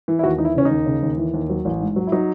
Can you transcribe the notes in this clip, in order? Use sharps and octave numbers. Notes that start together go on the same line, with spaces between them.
E3
E4
D#2 F#4
E3 D#4
E4
C#3 C#4
D#4
D#2
C#3
D#2
E3
D#2
F#3
A1
G#2
F#3
E4
F#3 D#4